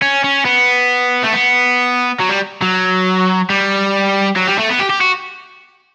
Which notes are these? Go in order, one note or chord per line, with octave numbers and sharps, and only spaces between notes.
C#4
C#4
B3
A3
B3
F#3
G3
F#3
G3
F#3
G3
A3
B3
G4
G4
F#4